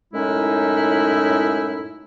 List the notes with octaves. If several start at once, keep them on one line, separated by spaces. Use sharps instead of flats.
F#2 A2 G#3 C#4 D#4 E4